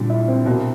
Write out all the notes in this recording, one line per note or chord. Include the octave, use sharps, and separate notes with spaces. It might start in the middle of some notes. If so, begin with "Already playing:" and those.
Already playing: A#2 D3 G3
E4
C4
B2 A#3